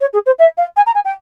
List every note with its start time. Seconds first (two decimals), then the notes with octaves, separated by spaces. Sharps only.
0.01 C#5
0.13 G#4
0.26 C5
0.39 E5
0.57 F5
0.76 G#5
0.86 A#5
0.95 G#5
1.05 G5